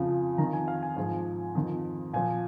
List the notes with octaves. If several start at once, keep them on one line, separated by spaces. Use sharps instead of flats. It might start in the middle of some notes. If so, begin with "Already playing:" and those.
Already playing: F2 C#3 F3
F2 D#3 A#5
G#5
F5
G#5
G#2 F3 G#5
F2 D#3
A#2 F3 G#5